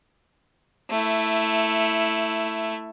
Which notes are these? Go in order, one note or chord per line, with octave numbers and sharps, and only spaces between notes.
A3 E4